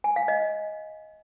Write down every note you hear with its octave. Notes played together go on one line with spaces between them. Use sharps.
G#5
F5
D#5